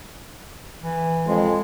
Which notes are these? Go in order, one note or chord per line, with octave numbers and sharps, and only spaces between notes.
E3
F2 G#3